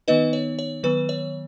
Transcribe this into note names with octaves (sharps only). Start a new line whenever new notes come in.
D#3 B3 D#4 B4 D#5
C#5
C#5
D#3 F#3 B3 B4
C#5